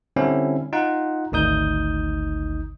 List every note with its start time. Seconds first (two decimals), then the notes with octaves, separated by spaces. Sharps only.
0.16 D3 G3 C4 C#4 E4
0.73 D#4 F4 F#5
1.32 G#1 D2 D#4 D#6 G6